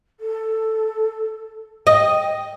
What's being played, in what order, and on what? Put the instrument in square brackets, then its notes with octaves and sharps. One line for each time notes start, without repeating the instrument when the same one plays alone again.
[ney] A4
[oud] D#5 [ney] G5